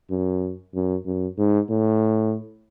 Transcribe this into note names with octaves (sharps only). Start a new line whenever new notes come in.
F#2
F#2
F#2
G#2
A2